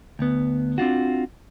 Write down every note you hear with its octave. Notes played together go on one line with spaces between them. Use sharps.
D2 B3
C4 D4 F4 F#4